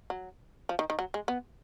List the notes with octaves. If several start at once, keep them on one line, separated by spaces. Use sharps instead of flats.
F#3
F3
D#3
D#3
F#3
G#3
B3